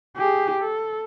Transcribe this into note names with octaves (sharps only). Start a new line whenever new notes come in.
G4 G#4
A4